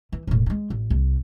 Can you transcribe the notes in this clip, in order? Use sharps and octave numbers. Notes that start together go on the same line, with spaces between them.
E3
E1 A2
G3 G#3
A1
C2